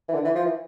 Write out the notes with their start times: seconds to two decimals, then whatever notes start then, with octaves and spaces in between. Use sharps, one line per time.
0.09 E3
0.15 D3
0.25 E3
0.35 F3
0.45 E3